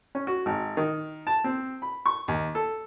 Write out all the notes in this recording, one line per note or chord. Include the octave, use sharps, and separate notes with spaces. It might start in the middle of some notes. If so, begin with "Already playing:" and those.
C#4
F#4
G#1
D#3
A5
C4
B5
C#6
D#2
A4